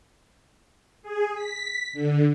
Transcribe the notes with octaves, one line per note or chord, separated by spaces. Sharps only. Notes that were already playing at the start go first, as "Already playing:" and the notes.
G#4
B6
D3